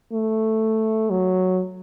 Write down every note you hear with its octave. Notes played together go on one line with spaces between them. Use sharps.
A3
F#3